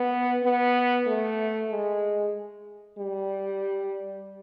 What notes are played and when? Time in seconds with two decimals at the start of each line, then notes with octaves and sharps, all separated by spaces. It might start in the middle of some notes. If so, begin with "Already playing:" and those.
Already playing: B3
0.43 B3
1.07 A3
1.71 G#3
2.98 G3